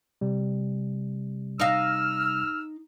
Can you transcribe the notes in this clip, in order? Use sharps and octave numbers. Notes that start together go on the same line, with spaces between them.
C3 G3
D#4 F5 E6 F6